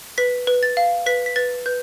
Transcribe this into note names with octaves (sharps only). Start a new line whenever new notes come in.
B4 B6
B4
A6
F5
B4 B6
B6
B4 A6
B4 G6